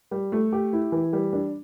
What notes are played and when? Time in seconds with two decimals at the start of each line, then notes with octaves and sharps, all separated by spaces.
0.11 G3
0.32 A3
0.53 G4
0.73 E4
0.92 E3
1.13 G3
1.33 D4